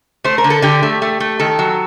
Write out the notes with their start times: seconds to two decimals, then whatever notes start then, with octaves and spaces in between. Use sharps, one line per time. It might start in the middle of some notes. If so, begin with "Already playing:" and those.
0.24 A3 C5
0.38 A#4
0.44 D3
0.50 A4
0.62 D3 G4
0.83 A3
1.02 A3
1.20 A3
1.40 D#3 A4
1.59 F#3